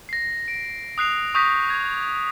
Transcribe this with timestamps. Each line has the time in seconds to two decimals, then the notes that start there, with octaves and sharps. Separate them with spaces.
0.09 A#6 C7
0.48 D7
0.98 D#6 F#6 C7 F7
1.34 C#6 D#6 G6 A#6 B6
1.70 G#6